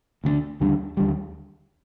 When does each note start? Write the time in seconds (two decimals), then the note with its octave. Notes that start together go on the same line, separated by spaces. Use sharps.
0.24 D2 D3 G3 D4
0.60 D#2 D3 G3 D4
0.97 D#2 D3 G3